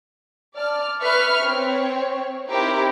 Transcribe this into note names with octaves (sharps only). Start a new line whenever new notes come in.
D5 A5 F6
B4 E5 C#6 F6
C4 C#5
C4 D#4 E4 G4 A#4